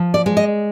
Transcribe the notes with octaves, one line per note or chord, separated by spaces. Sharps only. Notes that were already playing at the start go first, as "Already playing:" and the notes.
Already playing: F3
D5
G#3
D#5